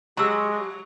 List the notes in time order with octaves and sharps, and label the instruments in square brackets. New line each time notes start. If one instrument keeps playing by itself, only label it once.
[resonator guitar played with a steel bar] F#3 [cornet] G#3 [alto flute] G4 [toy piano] A#5 E6